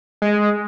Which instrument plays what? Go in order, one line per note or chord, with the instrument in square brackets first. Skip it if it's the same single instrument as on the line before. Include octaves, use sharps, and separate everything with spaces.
[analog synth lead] G#3